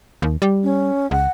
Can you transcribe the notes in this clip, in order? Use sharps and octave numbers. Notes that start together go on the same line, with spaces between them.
D#2
G3
C#4
C#2 F#5